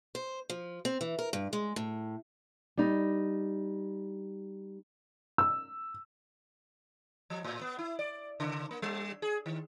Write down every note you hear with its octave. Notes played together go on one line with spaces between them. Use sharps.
C5
F3
C4
E3
A#4
G2
G#3
A2
G3 D#4
E6
F3
A2
B3
E4
D5
C#3
A#3
G3
G#4
D#3